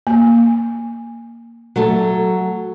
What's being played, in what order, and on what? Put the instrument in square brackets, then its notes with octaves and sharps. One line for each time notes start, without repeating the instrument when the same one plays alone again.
[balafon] A#3
[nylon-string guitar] F#3 A3 A4